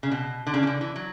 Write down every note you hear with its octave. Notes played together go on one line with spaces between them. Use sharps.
C#3
B2
D3
C#3
E3
D3
E3
F#3